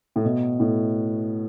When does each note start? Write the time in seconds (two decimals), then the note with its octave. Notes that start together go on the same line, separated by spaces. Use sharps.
0.16 A2
0.25 B2
0.60 A2